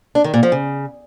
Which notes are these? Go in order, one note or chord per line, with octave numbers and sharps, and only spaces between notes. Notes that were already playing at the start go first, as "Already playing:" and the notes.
D4
D#3
A#2
F3
C#3